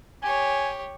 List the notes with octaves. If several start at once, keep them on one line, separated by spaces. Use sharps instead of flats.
G4 C#5 G#5